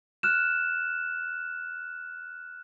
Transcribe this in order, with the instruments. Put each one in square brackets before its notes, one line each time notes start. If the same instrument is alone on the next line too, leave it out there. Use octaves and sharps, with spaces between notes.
[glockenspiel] F6 F#6 E7